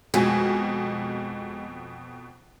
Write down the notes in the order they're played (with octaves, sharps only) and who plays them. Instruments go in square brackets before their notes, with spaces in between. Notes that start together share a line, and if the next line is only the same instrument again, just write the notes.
[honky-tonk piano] F2 B2 G#5 [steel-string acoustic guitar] G#3